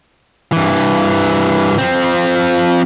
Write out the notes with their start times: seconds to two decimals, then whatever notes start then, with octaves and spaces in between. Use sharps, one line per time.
0.52 G2 E3
1.78 F3 C4